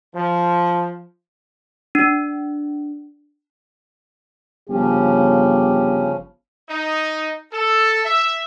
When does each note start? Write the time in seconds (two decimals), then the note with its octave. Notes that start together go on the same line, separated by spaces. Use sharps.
0.15 F3
1.95 D4
4.69 G1 C#3 F3 C#4 G4
6.68 D#4
7.52 A4
8.03 E5